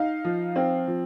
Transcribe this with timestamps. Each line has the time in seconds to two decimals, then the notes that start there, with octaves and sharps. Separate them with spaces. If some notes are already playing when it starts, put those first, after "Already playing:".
Already playing: D#4 F5
0.25 F3
0.56 C4
0.88 F3